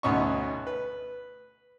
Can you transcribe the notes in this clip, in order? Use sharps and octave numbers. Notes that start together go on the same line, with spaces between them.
D2 B2 C#4 D#4 E5 C#6
B4